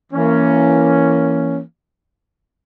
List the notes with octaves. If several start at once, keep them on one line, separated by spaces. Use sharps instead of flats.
E3 A#3 C#4